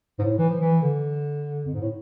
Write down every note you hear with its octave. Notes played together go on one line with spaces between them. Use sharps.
G#2
A2
E3
F3
E3
D3
F2
G#2
A2